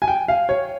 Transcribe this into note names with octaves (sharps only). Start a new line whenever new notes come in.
G#5
G5
F5
C#5